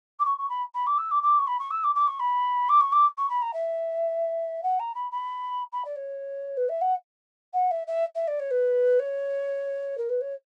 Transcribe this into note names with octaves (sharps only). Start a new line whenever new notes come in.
D6
C#6
C#6
B5
B5
D6
E6
D6
D6
C#6
B5
C#6
E6
D6
D6
C#6
B5
D6
C#6
D6
C#6
B5
A#5
E5
F#5
A#5
B5
B5
B5
D5
C#5
B4
E5
F#5
F#5
E5
E5
E5
D5
C#5
B4
C#5
A#4
B4
C#5